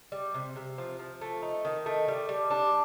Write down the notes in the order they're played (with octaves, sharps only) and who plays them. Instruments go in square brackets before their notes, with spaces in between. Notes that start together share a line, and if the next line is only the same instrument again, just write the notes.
[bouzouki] G3
C3
C3
F3
F3
A3
D#4
D#3
A3
G3
G3
D4